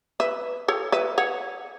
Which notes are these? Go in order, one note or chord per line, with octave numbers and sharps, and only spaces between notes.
B4 E5
A4 C#5
B4 E5
C#5 F#5